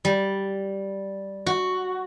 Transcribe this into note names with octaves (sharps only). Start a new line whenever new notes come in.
G3
F#4